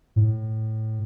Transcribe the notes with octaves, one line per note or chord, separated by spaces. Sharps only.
A2